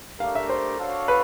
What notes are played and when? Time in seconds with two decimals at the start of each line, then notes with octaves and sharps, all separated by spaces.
0.20 A3 D4 G4 A#4 F5
0.35 E5
0.50 C5
0.79 D4 F#4 A4 C#5 F5
1.08 B4